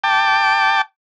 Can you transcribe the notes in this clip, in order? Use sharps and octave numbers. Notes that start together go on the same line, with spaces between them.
G5 A5 D6